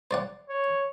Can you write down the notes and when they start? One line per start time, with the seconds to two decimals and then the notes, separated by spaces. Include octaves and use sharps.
0.11 C5 D5 F#5
0.49 C#5